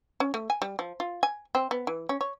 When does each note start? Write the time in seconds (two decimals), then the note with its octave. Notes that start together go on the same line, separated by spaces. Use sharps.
0.20 C#4
0.34 A3
0.50 G#5
0.62 G3
0.79 F3
1.00 F4
1.23 G#5
1.55 C4
1.71 B3
1.87 E3
2.09 C#4
2.21 C#5